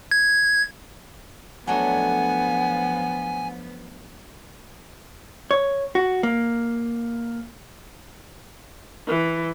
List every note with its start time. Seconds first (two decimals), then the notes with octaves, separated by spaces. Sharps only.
0.11 G#6
1.67 F3 F#3 A3 B3 D4 F#5 G#5
5.51 C#5
5.95 F#4
6.23 A#3
9.08 E3